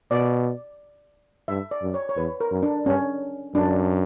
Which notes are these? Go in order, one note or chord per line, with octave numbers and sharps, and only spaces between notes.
B2 D5
G2 E5
D5
F#2
C#5
C#5
E2 B4
A#4
F#2
D4
G2 C#4
F#2 D4